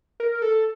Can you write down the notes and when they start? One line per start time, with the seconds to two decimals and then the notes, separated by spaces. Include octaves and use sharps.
0.20 A#4
0.42 A4